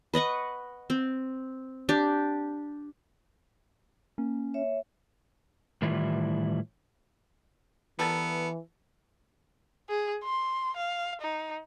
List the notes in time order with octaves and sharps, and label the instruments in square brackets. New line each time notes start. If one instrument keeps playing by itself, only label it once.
[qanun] B4 D#5 F#5 C#6
C4
D4 G4
[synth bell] A#3 [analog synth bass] C#4
[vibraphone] C#5 E5
[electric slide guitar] A2 D#3 E3 G3 E4 F4
[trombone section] E3 [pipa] G3 A4 A#4 [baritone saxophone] B3
[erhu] G#4
C6
F5
D#4